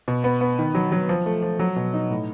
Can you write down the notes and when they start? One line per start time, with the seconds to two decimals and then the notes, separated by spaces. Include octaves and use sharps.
0.08 B2
0.24 B3
0.41 B3
0.59 D#3
0.75 F#3
0.92 F#3
1.09 F3
1.26 A3
1.42 F3
1.59 F#3
1.76 B2
1.94 D#4
2.10 A2